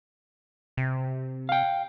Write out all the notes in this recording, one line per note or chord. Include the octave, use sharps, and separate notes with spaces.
C3
F5 G5